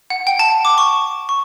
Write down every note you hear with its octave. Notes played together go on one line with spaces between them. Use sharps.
F#5
G5
A5
D6
C#6
C#6